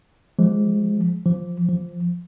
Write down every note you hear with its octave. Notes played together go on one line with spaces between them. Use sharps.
F3 G#3
F3
F3